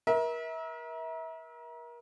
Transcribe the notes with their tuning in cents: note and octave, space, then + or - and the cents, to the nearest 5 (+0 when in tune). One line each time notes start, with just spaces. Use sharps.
A#4 +35 E5 -30